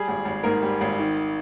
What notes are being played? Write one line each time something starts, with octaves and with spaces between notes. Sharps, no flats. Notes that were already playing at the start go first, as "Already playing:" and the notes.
Already playing: G3 G#4
G#1
G#1
G#2 A#4
G3
G#1
D#3